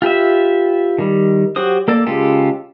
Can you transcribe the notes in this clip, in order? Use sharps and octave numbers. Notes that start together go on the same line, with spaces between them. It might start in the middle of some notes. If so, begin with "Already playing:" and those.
F4 G4 B4 E5
D#3 G3
F#3 F#4 G4 C5 D#6
A#3 A4 D5
C#3 G#3 F4 G4 A4